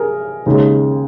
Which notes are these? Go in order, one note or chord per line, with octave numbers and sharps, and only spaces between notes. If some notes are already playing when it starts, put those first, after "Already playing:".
Already playing: G#4 A#4
D#2 C#3 G#3